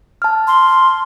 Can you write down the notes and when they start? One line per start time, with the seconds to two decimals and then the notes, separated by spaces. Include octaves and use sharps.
0.22 A5 F6
0.47 C6